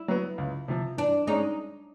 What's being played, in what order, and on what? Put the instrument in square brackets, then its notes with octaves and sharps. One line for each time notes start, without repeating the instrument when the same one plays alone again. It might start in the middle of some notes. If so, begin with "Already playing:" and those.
Already playing: [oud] E4
[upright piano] F#3 B3
C#2
C3 F3
[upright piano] E3 [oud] D4
[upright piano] G#3 C#4 [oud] D#4